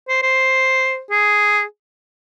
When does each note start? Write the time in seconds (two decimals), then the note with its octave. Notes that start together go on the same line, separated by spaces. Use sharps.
0.08 C5
0.22 C5
1.11 G#4